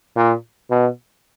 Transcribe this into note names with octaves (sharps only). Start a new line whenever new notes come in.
A#2
B2